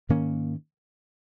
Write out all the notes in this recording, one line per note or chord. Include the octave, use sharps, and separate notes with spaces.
G#2 D#3 A#3 C#4